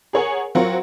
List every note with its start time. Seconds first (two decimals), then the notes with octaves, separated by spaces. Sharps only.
0.13 G#4 A#4 C#5 F#5 G#5
0.55 F#3 C4 F4 F#4 A#4